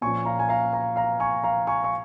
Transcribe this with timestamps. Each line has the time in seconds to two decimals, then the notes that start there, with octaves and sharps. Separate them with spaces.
0.01 A#2 F3 C#4 G#5 C#6
0.25 F5 A#5
0.39 G#5
0.49 F5 A#5
0.73 F5 A#5
0.96 F5 A#5
1.20 G#5 C#6
1.44 F5 A#5
1.67 G#5 C#6
1.84 C#6